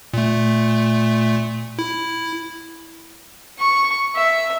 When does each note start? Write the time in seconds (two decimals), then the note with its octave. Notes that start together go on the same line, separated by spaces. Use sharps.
0.14 A#2 A3
1.79 E4
3.59 C#6
4.16 E5